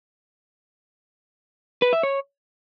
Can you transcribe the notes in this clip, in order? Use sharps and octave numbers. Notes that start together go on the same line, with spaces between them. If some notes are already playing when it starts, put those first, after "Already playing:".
B4
E5
C#5